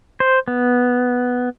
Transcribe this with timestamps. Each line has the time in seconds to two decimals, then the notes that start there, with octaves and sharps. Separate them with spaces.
0.20 C5
0.48 B3